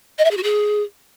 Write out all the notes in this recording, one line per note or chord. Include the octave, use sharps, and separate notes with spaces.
D#5
E5
G#4
F#4
G#4